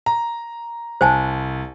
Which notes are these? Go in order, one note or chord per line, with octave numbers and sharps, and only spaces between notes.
A#5
C2 C5 G#5 A5